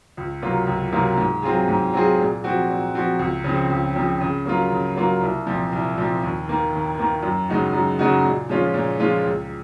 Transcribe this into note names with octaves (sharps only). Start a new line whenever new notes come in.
C#2
C3 F#3 A#3 F4
C#2
C3 F#3 A#3 F4
G#2
F#3 C4 F4 G#4
G#2
F#3 C4 F4 G#4
A#2
F3 C4 F#4
A#2
F3 C4 F#4
C#2
C#3 F3 C4
C#2
C#3 F3 C4
C#3
F#3 A#3 F4
C#3
F#3 A#3 F4
C2
A#2 F3 C4
C2
A#2 F3 C4
D#2
D#3 A#3
D#2
D#3 A#3
F#2
C#3 G#3 D#4 F#4
F#2
C#3 G#3 D#4 F#4
A#2
F3 G#3 C#4 F4
A#2
F3 G#3 C#4 F4
C#2